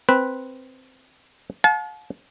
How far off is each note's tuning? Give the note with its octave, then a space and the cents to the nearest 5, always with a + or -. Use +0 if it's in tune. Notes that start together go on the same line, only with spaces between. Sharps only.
C4 +0 B4 +0
F5 +45 A5 -40